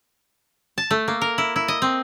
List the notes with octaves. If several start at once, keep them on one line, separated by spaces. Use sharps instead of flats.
A5
A3
A#3
A#4
E4
E4
D#5
C4